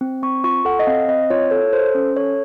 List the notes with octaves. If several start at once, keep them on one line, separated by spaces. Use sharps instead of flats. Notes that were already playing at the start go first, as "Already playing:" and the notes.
C4
C4 C#6
F4 C#6
A4 F#5
D#5
C4 F5
C4 D#5
F4 C#5
A4 C#5
A4 C5
C#4
A4 C#5